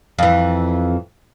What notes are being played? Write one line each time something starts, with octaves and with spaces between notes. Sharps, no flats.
F2 E3